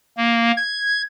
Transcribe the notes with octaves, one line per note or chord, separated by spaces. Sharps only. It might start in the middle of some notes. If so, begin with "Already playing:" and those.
A#3
G#6